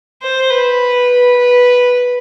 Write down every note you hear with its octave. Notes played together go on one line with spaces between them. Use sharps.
C5
B4
B4